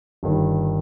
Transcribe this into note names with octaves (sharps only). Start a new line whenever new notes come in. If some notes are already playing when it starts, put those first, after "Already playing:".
G1 G2 D#3